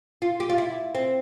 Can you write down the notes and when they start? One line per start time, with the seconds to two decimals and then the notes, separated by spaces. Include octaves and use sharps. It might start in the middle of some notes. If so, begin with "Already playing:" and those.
0.22 F4
0.40 G4
0.49 F4
0.58 E4
0.95 C4